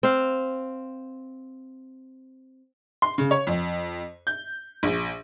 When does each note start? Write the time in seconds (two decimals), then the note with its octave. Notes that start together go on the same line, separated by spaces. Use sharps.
0.03 C4 F5
3.02 C6
3.18 C#3
3.31 C#5
3.47 F2
4.27 G6
4.83 A#1